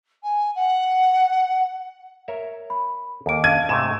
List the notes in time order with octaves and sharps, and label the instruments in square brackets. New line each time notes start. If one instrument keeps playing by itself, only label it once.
[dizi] G#5
F#5
[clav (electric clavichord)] A#4 C#5 E5
[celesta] B5
[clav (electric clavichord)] D#2 A#3 [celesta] A4 D7
[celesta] F5 A5 [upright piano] G#6 D#7
[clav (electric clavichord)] G#2 C3 A3 [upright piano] E7